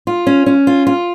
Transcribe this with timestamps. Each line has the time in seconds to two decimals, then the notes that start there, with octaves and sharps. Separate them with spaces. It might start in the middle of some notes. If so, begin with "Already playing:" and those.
0.07 F4
0.27 C#4
0.46 C#4
0.67 F4
0.87 F4